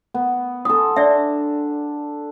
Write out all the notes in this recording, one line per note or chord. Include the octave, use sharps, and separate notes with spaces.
B3
A4 C6 D#6
D4 D5 E5